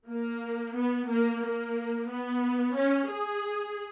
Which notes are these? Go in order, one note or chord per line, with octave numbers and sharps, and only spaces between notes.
A#3
B3
A#3
A#3
B3
C#4
G#4